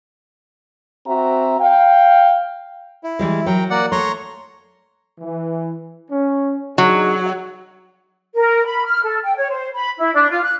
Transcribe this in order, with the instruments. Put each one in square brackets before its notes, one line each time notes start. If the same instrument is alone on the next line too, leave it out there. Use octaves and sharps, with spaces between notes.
[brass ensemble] C4 F#4 E5 A#5
F5 G5
[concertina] E4
[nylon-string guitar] E3 G3 G#3
[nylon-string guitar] F#3 [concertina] A#4 G5
[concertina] A#3 D5 F#5
[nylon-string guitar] A3 [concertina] C#5 A#5 C6
[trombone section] E3
C#4
[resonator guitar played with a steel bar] F#3 [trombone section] D4 D#4 G#4
[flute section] A#4
B5
F6
A4
G5
C#5
C5
B5
E4
D4
F4
F#6